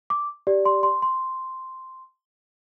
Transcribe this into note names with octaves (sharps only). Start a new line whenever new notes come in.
D6
G4 D5
C6
C6
C6